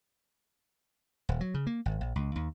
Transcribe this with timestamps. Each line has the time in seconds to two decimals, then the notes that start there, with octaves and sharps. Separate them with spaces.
1.29 D#1
1.41 F#3
1.54 C#3
1.67 A#3
1.86 G#1
2.01 A#1
2.16 C#2
2.36 D#2